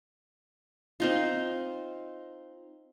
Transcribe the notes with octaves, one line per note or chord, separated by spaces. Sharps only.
C4 D#4 F4